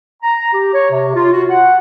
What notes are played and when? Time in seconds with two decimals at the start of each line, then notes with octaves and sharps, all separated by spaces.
0.22 A#5
0.53 G4
0.73 C#5
0.90 C3
1.15 F4
1.32 F#4
1.50 F#5